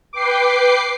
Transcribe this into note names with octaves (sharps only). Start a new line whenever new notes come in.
B4 G5 D6 C7